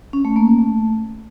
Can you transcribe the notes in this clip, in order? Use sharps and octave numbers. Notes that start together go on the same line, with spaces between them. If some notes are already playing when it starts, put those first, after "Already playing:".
C#4
A3
A#3
C#4
A3